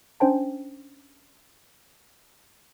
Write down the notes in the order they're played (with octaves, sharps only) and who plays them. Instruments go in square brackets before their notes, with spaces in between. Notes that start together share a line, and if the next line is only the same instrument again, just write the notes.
[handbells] C#4 D4 C5 G5 A5